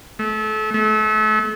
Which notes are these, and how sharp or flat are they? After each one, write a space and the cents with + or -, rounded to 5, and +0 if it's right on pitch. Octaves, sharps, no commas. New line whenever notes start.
A3 -30
A3 -35